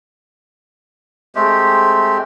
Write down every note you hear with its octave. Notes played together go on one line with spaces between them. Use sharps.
G#3 A3 C4 G4